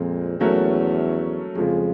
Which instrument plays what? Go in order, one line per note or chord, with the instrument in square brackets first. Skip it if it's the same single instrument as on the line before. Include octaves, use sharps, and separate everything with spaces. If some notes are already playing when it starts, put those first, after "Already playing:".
Already playing: [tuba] F2 [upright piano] A#2 F3 G#3 C4
[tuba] E2 [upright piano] F#3 A3 C#4 F#4 A#4
[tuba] F2 [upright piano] C#3 F3 G#3